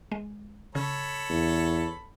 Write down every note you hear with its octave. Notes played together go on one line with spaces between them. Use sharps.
G#3
C#3 A4 C#5 B5
E2